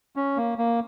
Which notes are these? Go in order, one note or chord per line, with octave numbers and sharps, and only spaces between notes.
C#4
A#3
A#3